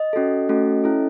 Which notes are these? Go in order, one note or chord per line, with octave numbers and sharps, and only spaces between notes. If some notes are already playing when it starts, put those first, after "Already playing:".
Already playing: D#5
C#4 F#4 A4
A3 C#4 F#4 A4
C#4 E4 A4